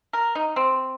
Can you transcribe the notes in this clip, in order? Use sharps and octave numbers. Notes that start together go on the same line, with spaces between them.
A#4
D#4
C4